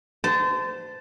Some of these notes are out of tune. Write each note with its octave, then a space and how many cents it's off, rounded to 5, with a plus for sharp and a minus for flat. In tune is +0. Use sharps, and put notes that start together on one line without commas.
C5 -30 A5 +0